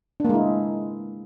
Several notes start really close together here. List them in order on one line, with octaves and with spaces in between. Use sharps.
D4 A#3 G#3 E4